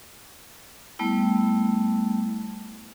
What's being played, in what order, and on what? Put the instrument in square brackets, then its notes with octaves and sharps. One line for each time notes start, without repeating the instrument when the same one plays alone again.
[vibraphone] G3 A3 B3 E4